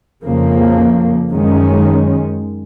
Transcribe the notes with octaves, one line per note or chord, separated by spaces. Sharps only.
F2 C#3 F3 A#3
F#2 D#3 G#3 C#4